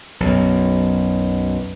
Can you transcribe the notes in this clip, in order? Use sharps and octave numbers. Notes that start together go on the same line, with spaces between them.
B1 F#2